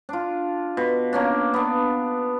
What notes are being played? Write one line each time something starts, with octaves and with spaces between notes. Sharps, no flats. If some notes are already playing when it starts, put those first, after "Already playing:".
D4 F4
B2
A#3 C#4 D4
B3 D4